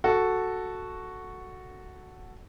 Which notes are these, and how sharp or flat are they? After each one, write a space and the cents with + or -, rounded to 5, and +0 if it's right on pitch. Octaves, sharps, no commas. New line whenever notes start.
F#4 +0 A4 +0